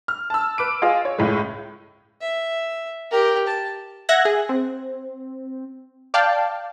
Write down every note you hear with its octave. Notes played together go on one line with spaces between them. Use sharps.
F6
A5 E6
B4 D6 D7
F4 G#4 D#5 F5
C#5
C#2 A2 G#3
E5
G4 A#4
A5
E5 F#5 F#6 G#6 A#6
G#4
C4
D5 F5 G5 A5